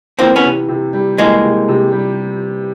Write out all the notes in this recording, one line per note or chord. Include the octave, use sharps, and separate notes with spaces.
E3 A#3 C4
B3 C#4
C3
C3
G3
E3 G#3 A#3
C3
C3
G3